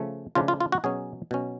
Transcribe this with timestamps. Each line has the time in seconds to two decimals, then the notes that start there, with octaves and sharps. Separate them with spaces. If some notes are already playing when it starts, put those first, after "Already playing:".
Already playing: C#3 F3 A3
0.35 C#3 F3 A3 D4 F4
0.48 F4
0.61 F4
0.72 F#4
0.84 B2 F#3 C#4 G#4
1.31 B2 F#3 C#4